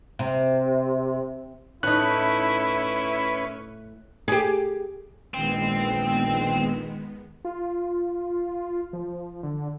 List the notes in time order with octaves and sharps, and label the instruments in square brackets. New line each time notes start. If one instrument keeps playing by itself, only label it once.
[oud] C3
[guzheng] A2 D#4 [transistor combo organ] C#4 B4 [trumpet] E4 [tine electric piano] F#6
[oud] G4 G#4
[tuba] A#1 [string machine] D#3 G#3 B3 [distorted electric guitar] C4
[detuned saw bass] F4
F3
D3